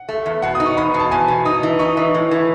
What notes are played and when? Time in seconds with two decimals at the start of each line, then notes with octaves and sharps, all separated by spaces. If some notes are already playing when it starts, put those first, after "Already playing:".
Already playing: F#5
0.09 A3
0.26 E2
0.42 B2 F#5
0.55 D#6
0.60 D#4
0.66 C#6
0.77 E2 B5
0.94 B2
1.00 A5
1.11 E2 G#5
1.28 B2
1.45 D#4 D#6
1.63 E3
1.79 D#4 C#6
1.97 E3
2.14 A2
2.31 E3